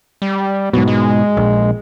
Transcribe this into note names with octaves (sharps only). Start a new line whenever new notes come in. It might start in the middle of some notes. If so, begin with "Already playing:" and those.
G3
G#2 B2 F#3
G#3
A#1